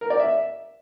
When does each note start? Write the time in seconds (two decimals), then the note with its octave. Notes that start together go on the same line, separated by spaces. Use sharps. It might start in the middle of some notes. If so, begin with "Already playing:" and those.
0.01 A#4
0.10 D5
0.19 E5